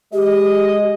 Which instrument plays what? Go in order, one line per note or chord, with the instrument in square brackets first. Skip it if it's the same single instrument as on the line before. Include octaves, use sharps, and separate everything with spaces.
[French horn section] G#3 D#5 [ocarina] G4